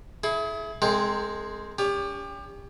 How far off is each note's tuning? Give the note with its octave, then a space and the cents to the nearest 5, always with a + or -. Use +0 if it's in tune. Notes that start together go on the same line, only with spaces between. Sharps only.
E4 +0 G#4 +35
G#3 +0 C4 +10 A#4 -45
C#4 +45 G4 +30